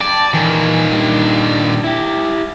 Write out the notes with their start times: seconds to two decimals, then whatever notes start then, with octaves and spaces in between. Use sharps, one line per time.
0.01 D5 G5 A5
0.34 A#2 D#3 E3
0.92 G2 D4
1.83 E4 G4